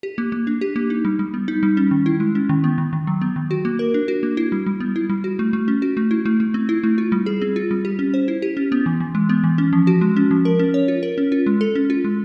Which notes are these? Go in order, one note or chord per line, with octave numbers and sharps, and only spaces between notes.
G4
A#3
A#3
D4
G4
A#3
D#4
G3
G3
B3
D#4
G3
C#4
D#3
E4
G#3
C#4
D#3
B3
D#3
D#3
F#3
B3
D#3
F#4
A#3
A#4
D4
F#4
A#3
E4
G3
G3
B3
E4
G3
F#4
A3
A3
C#4
F#4
A3
E4
A3
A3
C4
E4
A3
F4
G3
G#4
C4
F4
G3
G4
C#4
C5
E4
G4
C#4
B3
E3
E3
G#3
B3
E3
C#4
F3
F#4
G#3
C#4
F3
A#4
C#4
C#5
F4
A#4
C#4
F4
G#3
A4
C#4
F4
G#3